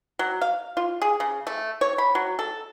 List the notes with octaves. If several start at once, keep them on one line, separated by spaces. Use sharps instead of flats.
F#3
F5
F4
G#4
C#3
A3
C#5
B5
F#3
A4